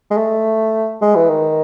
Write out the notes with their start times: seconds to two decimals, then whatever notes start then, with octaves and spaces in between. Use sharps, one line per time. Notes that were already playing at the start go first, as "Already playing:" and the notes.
0.11 G#3
0.17 A3
1.02 G#3
1.15 E3
1.29 D#3